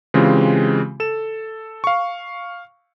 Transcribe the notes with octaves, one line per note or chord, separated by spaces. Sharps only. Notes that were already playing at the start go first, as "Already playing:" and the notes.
C#3 E3 G#3 C4 F4 G4
A4 E7
F5 C#6